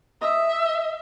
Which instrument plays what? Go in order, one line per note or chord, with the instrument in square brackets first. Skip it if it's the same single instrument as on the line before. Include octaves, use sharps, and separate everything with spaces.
[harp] D#5 D#6 E6 [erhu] E5